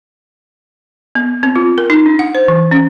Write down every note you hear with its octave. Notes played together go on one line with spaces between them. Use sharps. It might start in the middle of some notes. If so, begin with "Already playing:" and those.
B3
C4
F4
A#4
D#4
D4
F#5
C5
E3
C#4